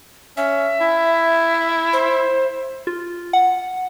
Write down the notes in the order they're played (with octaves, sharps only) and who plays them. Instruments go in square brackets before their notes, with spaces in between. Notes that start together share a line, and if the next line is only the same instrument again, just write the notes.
[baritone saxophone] C#4 [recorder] E5
[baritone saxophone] E4
[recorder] C5
[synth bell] F4
F#5